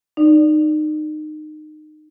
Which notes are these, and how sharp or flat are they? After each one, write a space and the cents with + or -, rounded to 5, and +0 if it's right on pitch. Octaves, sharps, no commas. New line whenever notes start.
D#4 -25 D5 +0